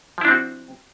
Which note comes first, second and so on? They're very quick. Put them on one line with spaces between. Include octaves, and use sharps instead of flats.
F3 E4 D4 C4 F#4